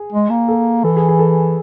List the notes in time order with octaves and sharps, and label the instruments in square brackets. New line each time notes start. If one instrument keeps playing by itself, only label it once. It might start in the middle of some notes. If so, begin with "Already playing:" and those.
Already playing: [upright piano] G#4
[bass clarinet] G#3
A#3
[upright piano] A4
[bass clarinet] E3 [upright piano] A4
[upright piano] G#4
G#4
A4